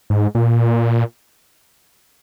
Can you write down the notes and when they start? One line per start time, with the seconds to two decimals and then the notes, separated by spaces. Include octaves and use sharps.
0.10 G#2
0.35 A#2